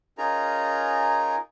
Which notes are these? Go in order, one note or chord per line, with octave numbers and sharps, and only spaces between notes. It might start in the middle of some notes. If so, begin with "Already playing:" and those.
C#4 D#4 F4 G#4 A#4 A#5